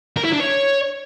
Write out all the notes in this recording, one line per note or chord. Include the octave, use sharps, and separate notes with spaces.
A#4
E4
D4
C#5